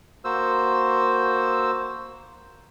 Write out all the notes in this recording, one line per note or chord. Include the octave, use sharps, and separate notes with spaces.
A#3 F#4 C5 E6